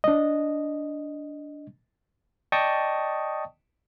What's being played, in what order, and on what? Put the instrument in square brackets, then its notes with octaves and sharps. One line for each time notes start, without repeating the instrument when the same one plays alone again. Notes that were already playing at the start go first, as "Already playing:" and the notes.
[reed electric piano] D4 D#5
[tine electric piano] D5 D#5 G5 A5 C#6 D#6